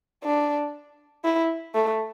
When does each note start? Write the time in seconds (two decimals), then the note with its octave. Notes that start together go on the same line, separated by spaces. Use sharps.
0.23 D4
1.24 E4
1.75 A3